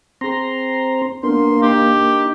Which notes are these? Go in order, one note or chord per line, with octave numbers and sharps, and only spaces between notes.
C4 G#4 C5 A#5 C6
A#3 B3 D4 A#4 C6
D#4 G4